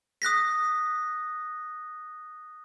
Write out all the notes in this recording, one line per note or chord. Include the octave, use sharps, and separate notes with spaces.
D#6 F#6 A#6 B6